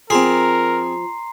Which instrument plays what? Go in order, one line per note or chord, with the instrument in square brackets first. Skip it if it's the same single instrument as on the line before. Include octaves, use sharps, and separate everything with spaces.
[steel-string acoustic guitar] F3 [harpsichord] C4 G#4 [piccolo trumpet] A#4 [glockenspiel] A#5 C6 C7